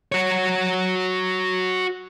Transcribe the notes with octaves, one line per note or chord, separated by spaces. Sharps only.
F#4 C#5